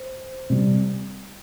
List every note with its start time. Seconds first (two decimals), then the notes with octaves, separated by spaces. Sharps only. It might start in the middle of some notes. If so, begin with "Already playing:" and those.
Already playing: C5
0.50 C3 G3